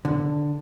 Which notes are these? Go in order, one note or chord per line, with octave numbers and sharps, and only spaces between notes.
D3